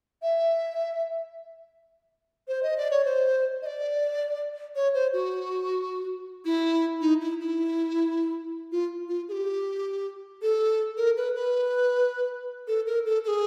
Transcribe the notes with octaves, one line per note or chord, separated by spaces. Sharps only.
E5
C5
D#5
D5
C#5
C5
D#5
D5
C#5
C5
F#4
E4
D#4
E4
E4
F4
F4
G#4
G4
A4
A#4
B4
B4
A4
A#4
A4
A4
G#4